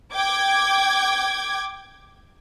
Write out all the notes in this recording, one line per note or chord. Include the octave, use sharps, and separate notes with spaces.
G5 D6 G#6